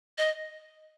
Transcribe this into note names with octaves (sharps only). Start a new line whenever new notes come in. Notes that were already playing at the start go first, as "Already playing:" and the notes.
D#5